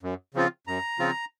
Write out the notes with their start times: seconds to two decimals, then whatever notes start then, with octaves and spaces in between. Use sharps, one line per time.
0.03 F#2
0.34 C#3 F3 C4 F4
0.67 F#2 A#5
0.99 C#3 F3 C4 F4